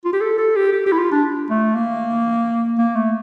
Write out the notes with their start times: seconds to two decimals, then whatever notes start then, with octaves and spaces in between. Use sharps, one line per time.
0.05 F4
0.13 G4
0.21 A4
0.38 A4
0.56 G4
0.73 G4
0.86 G4
0.92 E4
0.99 F4
1.12 D4
1.50 A3
1.75 A#3
2.78 A#3
2.96 A3